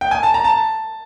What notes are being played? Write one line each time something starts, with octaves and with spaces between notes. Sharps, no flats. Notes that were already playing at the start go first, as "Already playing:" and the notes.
G5
G#5
A5
A#5
A5